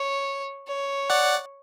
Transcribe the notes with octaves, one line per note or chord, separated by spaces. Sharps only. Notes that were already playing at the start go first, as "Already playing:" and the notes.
Already playing: C#5
C#5
D5 F#5